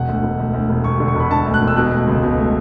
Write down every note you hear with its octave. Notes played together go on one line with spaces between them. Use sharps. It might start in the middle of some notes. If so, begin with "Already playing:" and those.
Already playing: E1 F#5
D2
E1
D2
D2
E1
E1 C#6
D3
C#6
E1 B5
E1 A5
D2
F#6
E1
E6
B2 F#6
A3
C#2
B2
A3